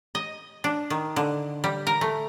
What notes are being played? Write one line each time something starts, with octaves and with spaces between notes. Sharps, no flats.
D#5
D4
D#3
D3
G3
A#4
A3